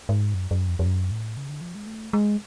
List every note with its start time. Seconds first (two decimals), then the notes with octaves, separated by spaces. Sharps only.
0.09 G#2
0.34 F#2
0.51 F#2
0.69 F2
0.79 F2
0.86 F#2
1.11 A2
1.37 C#3
1.49 D3
1.61 F3
1.75 G#3
1.87 A3
2.13 G#3